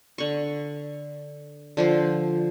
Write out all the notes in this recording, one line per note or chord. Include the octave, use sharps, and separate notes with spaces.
D3 C#6
D3 F3 C5